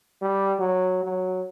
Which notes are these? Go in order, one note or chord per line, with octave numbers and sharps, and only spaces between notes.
G3
F#3
F#3